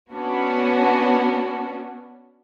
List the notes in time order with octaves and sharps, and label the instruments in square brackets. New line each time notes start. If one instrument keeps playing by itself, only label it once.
[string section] B3 C#4 D4 F#4